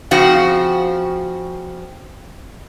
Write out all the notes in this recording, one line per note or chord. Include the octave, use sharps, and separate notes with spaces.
C#3 F3 C4 F#4